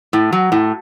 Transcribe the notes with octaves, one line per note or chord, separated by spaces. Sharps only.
A2
F#3
A2